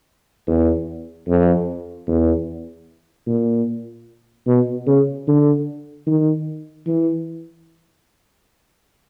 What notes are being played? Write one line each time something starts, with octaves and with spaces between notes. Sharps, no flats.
E2
F2
E2
A#2
B2
C#3
D3
D#3
E3